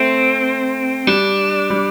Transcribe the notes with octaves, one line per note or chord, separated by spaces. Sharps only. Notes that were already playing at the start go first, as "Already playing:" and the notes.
Already playing: A3 C4
G3 D4
G3